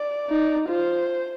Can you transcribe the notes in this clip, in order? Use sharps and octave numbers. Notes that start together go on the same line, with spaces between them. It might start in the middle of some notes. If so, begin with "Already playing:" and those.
Already playing: D5
D#4
F4 C5